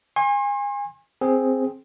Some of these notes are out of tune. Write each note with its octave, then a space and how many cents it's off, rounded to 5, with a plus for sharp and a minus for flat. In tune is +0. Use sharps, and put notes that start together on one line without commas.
G#5 -30 C6 +40
C4 +0 G#4 +0